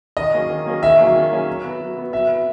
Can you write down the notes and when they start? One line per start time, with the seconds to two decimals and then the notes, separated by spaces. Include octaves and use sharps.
0.17 D#3 D#5
0.34 F#3 A#3 C#4 G#4
0.50 D#3
0.65 F#3 A#3 C#4 G#4
0.82 D#3 E5
0.99 F#3 A#3 C#4 G#4
1.15 D#3
1.32 F#3 A#3 C#4 G#4
1.47 F#3
1.64 B3 F#4
1.81 F#3
1.97 B3 F#4
2.13 F#3 E5
2.28 B3 F#4